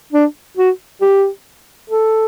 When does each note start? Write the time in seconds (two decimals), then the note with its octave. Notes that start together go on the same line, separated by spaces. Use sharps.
0.12 D4
0.57 F#4
1.01 G4
1.90 A4